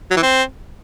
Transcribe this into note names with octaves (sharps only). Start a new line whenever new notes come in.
F#3
E3
C4